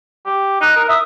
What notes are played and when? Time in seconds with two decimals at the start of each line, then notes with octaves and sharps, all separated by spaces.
0.26 G4
0.61 D#4 F#6
0.76 A#4
0.89 E5 D#6